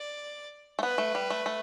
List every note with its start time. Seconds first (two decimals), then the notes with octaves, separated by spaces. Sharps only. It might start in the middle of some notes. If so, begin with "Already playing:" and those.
Already playing: D5
0.79 A3
0.83 B3 B4
0.98 A3
1.15 G3
1.30 A3
1.46 A3